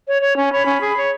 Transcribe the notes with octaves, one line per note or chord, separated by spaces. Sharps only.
C#5
C#5
C#4
C#5 B5
C#4
G#4
C#5